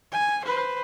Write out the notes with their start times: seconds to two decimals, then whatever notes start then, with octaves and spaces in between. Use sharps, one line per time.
0.12 G#5
0.44 B4 C5